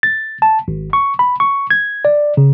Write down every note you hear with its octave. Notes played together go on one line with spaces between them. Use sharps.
A6
A5
G#1
C#6
B5
C#6
G#6
D5
C#3